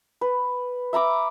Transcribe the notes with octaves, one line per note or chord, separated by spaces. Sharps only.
B4
E5 A#5 B5 D6